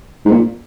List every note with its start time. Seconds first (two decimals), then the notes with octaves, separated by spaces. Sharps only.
0.25 G#2
0.31 A#2